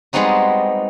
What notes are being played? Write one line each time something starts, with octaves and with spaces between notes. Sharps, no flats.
G3 G#3 B3 C4 D#4 F#4